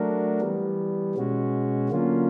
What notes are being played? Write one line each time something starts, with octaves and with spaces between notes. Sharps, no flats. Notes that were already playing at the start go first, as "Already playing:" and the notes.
Already playing: F#3 A3 D4 F#4 A#4
E3 G3 B3
B2 G#3 C#4 F#4
D3 F#3 A#3 C#4 F4